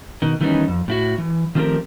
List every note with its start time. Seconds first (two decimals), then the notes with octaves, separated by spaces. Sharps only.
0.22 B2 D#3
0.41 D#3 E3 G3 B3 C#4 D#4
0.68 F2
0.88 A2 E4 F#4
1.18 E3
1.55 D#3 F3 A3 C4 G4 A#4